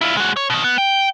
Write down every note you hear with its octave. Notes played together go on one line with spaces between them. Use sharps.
E4 F4
G#3 F#4
C#5
B2 D#3
B3
G5